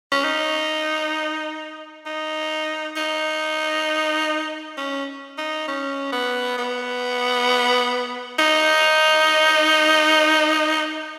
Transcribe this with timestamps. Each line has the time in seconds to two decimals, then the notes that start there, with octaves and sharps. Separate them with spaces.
0.12 C#4
0.24 D#4
2.06 D#4
2.96 D#4
4.77 C#4
5.38 D#4
5.68 C#4
6.12 B3
6.58 B3
8.39 D#4